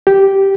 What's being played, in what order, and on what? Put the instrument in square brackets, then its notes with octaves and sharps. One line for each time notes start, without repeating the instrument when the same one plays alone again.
[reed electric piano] G4